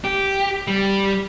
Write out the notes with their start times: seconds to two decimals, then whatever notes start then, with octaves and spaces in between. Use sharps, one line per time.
0.05 G4
0.67 G3